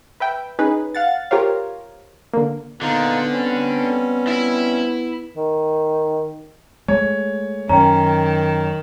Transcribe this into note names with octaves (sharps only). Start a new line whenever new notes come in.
B4 E5 G5
C#4 D#4 G#4 B4
F5 F#5 A6
F4 G4 A#4 C5 C#5 F5
D3 A#3
A#2 D3 B3 D#4 F4
G3 C4 C#4
E4 E5
D#3
G#3 A3 C#5
F#2 D#3 C#4 G5 A#5